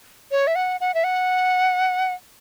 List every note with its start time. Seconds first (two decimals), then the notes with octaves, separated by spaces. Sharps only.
0.31 C#5
0.47 E5
0.55 F#5
0.81 F#5
0.94 E5
1.04 F#5